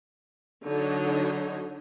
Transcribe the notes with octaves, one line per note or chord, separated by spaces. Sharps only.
D3 F#3 D#4 C#5